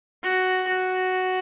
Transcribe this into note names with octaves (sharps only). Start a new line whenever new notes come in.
F#4
F#4